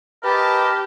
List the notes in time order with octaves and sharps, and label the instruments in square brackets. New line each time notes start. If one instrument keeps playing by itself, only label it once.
[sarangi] G4 [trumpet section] A#4 D#5 A5 [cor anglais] B4